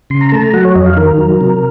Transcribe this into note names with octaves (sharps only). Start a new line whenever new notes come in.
C#3 C6
A#5
A3 A5
A#5
F#3 F#5
C#5
F2 D#5
F5
D#3 A#4
F#3
C3